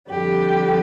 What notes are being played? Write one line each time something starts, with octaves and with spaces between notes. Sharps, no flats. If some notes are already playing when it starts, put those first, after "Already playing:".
F2 D3 G3 G4